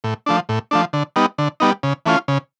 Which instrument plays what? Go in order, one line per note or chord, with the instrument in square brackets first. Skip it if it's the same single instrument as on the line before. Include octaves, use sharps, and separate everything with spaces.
[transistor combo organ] A2
F3 A3 D4
A2
F3 A3 D4
D3
G3 B3 D#4
D3
G3 B3 D#4
C#3
E3 A3 C#4 F4
C#3